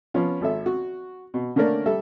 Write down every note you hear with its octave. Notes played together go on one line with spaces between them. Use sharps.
F3 B3 C#4 F4
G#1 A4 E5
F#4
B2
D3 A3 A#3 C#4 A#4 D5
G3 A4 E5